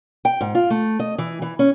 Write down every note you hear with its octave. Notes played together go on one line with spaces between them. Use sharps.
G5
G#2
F4
A3
D#5
E3
E3
C#4